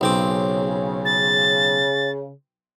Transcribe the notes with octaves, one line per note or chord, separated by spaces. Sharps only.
B1 C#3 C4 D6
A6